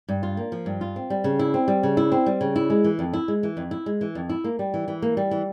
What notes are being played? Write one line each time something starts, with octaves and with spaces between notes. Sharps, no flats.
G2
F4
A#3
F3
G2
F4
C4
G3
C#3
E4
C4
G3
C#3
E4
C4
G3
C#3
E4
G#3
E3
F2
E4
G#3
E3
F2
E4
G#3
E3
F2
E4
A#3
G3
E3
E3
A#3
G3
E3